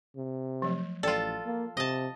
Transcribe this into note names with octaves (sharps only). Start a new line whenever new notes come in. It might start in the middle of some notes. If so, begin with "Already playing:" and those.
C3
F3 F#3 A3
A1 F4 A4 D5 G5 C6
A#3
C3 D#5 A5